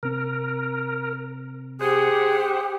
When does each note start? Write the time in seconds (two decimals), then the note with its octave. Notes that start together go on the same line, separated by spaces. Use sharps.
0.03 C3 C4 A#4
1.81 G4 G#4 C5 F#5